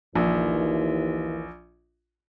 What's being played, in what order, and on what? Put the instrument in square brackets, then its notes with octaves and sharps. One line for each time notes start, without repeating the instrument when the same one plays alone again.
[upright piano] A#1 [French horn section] D#2 E3